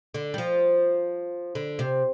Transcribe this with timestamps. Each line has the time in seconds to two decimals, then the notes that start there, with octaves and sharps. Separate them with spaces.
0.14 D3
0.34 G3
0.38 F3
1.55 D3
1.79 C3